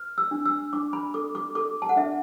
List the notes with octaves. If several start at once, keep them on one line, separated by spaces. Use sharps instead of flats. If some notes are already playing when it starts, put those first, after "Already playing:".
Already playing: B4
E6
D4
E6
D4 D6
B5
A4 D6
D6
A4 D6
A5
F#5
D4 E5